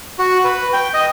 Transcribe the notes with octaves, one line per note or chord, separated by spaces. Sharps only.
F#4
B4
G5
D#5